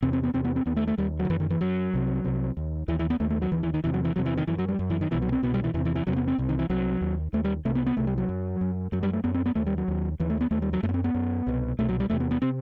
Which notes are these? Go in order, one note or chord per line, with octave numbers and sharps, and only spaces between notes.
E2 C3 C4
C4
B3
E2 C3 C4
B3
C4
D#2 B3
A3
A3
D#2 G3
F#3
D#3
F#2 E3
D#3
E3
F#2 F#3
C2 C3
C2 C3
D#2
D#2 E3
E3
B3
D#2 A3
A3
F#3
D#2 E3
E3
D#3
E2 C3 E3
F#3
E3
E2 C3 F#3
E3
D#3
F#2 E3
F#3
G3
F#2
E3
D#3
C2 B2 E3
F#3
C4
C2 B2 B3
G3
E3
E2 C3 E3
E3
E3
E2 C3 F#3
B3
C4
C2 C3
D#3
E3
C2 C3 F#3
D#2
D#2 A3
G3
C2 C3 A3
B3
B3
C2 C3 A3
G3
F#3
F#2
F#2
F#2 F#3
G3
A3
F#2 B3
C4
B3
D#2 A3
G3
F#3
D#2
D#2 E3
A3
B3
D#2 A3
G3
F#3
F#2 A3
B3
C4
B3
F#2
C2 B2
C2 B2 A3
F#3
G3
E2 C3 A3
B3
B3
C3 C4